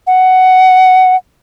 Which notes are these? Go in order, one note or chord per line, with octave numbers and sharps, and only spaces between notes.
F#5